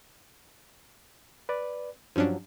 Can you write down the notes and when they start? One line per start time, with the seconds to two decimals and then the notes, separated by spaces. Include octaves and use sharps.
1.49 B4 D5
2.16 G2 F3 F#3 C#4 D4